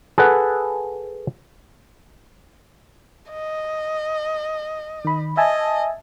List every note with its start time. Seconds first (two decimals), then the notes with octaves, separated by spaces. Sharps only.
0.18 G#4 A4 B4 F#5
3.31 D#5
5.05 D#3 B5
5.37 D#5 E5 G#5 A5